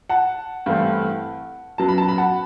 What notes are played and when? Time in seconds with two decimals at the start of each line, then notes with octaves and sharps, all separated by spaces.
0.09 F#5 A5
0.66 G2 E3 A3 C4
1.78 F#2 F#3 B3 A5
1.89 B5
1.98 A5
2.08 B5
2.18 F#5 A5